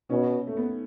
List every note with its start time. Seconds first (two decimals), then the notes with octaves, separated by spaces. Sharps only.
0.10 B2 C#4
0.47 A3
0.57 B3